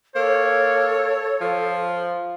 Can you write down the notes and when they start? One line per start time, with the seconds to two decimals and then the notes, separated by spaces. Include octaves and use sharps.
0.16 A#3 A4 C#5
1.41 F3